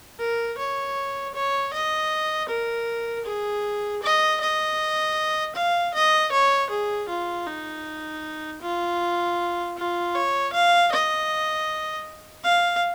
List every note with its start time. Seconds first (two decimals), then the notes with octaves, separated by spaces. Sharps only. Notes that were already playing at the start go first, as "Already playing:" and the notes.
0.19 A#4
0.58 C#5
1.34 C#5
1.73 D#5
2.49 A#4
3.25 G#4
4.03 D#5
4.41 D#5
5.56 F5
5.94 D#5
6.32 C#5
6.70 G#4
7.09 F4
7.47 D#4
8.61 F4
9.77 F4
10.15 C#5
10.53 F5
10.92 D#5
12.44 F5